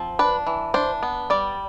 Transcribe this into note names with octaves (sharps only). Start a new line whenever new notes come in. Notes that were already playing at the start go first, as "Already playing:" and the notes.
Already playing: F3 C4
D4 B4
E3
D4 C5
B3
G3 D5